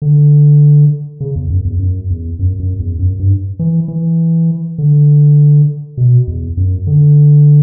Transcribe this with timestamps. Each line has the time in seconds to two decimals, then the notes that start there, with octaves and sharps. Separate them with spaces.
0.02 D3
1.20 C#3
1.36 E2
1.50 F#2
1.65 E2
1.80 F#2
2.10 E2
2.39 F#2
2.60 F#2
2.80 E2
2.99 F#2
3.20 G2
3.59 E3
3.88 E3
4.78 D3
5.97 B2
6.28 E2
6.57 F#2
6.87 D3